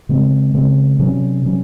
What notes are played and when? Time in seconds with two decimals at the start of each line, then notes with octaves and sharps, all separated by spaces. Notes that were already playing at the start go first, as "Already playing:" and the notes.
0.09 C#3 G#3 C4
0.54 C#3 G#3 C4
0.99 C3 F#3 C#4
1.45 C3 F#3 C#4